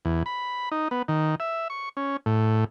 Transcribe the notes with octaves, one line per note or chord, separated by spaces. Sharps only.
E2
B5
D#4
B3
D#3
E5
C#6
C#4
A2